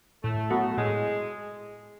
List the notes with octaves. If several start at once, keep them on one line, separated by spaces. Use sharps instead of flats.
A2 A3
F#3 B3 F#4 A4
A2 G#3